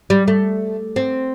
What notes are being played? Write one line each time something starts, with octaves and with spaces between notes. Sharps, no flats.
G3
A3
C4